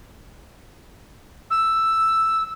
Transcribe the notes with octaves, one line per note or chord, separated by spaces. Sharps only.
E6